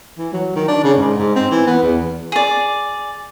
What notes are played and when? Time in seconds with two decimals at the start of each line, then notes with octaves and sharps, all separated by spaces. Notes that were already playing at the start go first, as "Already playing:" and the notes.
0.18 E3
0.33 F#3
0.56 D#3
0.68 D4
0.84 C#3
0.97 G#2
1.18 G#2
1.35 C4
1.51 E3
1.67 B3
1.83 E2
2.32 G#4 D5